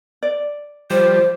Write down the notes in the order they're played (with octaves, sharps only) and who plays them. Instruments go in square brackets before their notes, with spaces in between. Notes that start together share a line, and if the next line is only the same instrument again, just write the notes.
[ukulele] D5
[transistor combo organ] F3 G3 [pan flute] C5